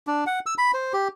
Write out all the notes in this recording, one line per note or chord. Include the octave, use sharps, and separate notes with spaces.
D4
F#5
E6
B5
C5
G4